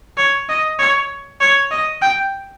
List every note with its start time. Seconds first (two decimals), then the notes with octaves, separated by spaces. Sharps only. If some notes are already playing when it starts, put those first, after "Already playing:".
0.17 C#5
0.49 D#5
0.79 C#5
1.41 C#5
1.71 D#5
2.02 G5